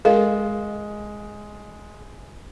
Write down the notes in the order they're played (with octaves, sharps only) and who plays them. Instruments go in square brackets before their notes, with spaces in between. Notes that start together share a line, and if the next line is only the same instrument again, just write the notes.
[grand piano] G#3 [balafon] A#4 D#5 F5